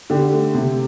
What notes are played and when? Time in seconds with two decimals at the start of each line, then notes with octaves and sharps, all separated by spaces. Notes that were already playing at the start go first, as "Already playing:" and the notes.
0.10 D3 G4
0.33 A3
0.54 C3